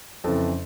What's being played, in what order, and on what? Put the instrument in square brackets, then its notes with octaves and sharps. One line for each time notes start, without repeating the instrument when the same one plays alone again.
[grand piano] F2 C#3 E3 A4